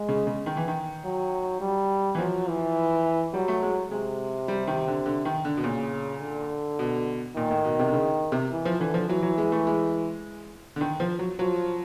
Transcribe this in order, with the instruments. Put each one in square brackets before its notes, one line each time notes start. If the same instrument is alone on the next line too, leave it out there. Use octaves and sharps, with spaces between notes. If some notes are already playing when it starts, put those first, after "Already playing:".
Already playing: [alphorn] G#3
[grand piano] C#3
C#3
D#3
E3
D#3
[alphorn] F#3
G3
[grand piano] E3
[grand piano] F3 [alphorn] F#3
[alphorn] E3
[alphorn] F#3 [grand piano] G3
[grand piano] A3
G#3
[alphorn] C3 [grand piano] G#3
[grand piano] G3
D#3
D3
D3
D#3
D3
B2
[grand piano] A#2 [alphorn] C#3
[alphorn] D3
[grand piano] B2
[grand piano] A#2 [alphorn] D#3
[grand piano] A2
B2
C3
D3
C#3
C3
[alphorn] E3
[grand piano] F3
[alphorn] D3 [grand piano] E3
[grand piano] F3
[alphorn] E3 [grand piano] F#3
[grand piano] F#3
G#3
A3
G#3
D3
D#3
F3
F#3
[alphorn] F3 [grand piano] F#3